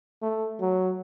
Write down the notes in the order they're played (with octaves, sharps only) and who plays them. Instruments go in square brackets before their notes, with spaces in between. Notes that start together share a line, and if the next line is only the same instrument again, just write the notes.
[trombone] A3
F#3